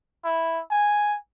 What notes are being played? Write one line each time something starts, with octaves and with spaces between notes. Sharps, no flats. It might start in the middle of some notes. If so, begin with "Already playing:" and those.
E4
G#5